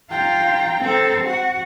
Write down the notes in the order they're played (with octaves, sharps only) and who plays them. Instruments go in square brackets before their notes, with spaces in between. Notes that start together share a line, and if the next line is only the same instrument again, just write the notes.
[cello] F4 [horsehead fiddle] G5 A#5
[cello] C4 A4
F#4